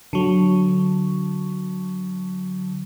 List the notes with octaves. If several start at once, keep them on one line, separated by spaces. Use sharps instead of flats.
D3 F#3